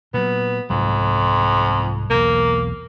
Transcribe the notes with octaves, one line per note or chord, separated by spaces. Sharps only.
A#2 F#3 B3
C2 F2 G#2 F#3
B1 E2 A#3